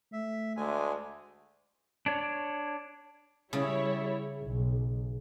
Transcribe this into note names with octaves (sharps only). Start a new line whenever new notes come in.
A3 E5
D2 G#3 G#5
D4 C#5
C#3 G3 E4 C#5
B1